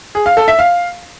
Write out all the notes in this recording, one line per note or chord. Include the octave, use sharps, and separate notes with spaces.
G#4
F5
A4
E5
F5